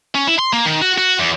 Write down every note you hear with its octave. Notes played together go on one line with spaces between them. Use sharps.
C#4
E4
C6
A#3
D#3
F#4
F#4
E2